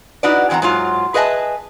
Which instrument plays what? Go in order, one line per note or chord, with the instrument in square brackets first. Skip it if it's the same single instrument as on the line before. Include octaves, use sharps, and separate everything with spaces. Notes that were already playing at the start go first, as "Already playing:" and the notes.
[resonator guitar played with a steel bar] D#4 E4 F#4 B4 D5
E2 E3 C4 F#5 A#5
G#2 F#3 F4
G#4 B4 D#5 E5 G#5 A5